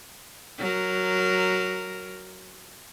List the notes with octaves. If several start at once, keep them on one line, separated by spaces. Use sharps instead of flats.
F#3 A#4